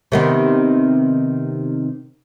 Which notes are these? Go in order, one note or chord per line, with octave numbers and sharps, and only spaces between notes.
C3 D#3 B3